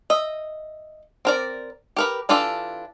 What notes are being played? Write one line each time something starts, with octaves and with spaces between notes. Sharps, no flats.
D#5 E5
C4 A#4 D5
G4 A#4 B4
E3 D4 F4 G4 A4